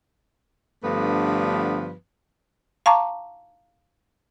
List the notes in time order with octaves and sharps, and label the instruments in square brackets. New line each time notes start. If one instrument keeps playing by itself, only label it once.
[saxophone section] G2 D3 F3 A3 B3 B4
[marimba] F5 A5 A#5 C#6 D6